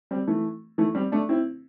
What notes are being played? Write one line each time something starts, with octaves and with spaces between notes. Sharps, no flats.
G3 C4
E3 A3
E3 A3
G3 C4
A3 D4
C4 E4